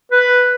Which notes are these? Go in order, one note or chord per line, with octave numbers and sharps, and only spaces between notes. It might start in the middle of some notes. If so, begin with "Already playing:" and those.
B4